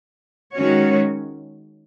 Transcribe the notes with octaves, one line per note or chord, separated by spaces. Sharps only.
D#3 G#3 C#4 F#4 C#5